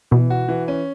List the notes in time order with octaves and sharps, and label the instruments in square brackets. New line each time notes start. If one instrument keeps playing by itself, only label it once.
[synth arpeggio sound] B2 [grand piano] E3
[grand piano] F#4
E3
C#4